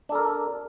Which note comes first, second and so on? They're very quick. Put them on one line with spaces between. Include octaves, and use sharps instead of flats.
D4 A4 A#4